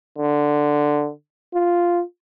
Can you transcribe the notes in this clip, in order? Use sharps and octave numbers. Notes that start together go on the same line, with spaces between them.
D3
F4